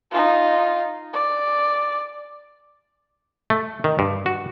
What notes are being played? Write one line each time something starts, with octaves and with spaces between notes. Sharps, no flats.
D#4 F4
D5
A3
D#3
G2
F#4